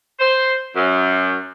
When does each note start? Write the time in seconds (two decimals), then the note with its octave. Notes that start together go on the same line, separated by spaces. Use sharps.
0.19 C5
0.75 F#2